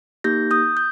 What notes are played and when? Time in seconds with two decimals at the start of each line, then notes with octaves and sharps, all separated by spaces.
0.24 A#3 D#4 G4 G6 A#6
0.51 D#6 G6
0.77 G6